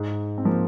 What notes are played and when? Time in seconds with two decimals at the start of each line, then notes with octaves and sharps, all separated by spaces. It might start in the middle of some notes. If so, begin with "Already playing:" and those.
Already playing: G#2
0.38 C4
0.45 F3 A#3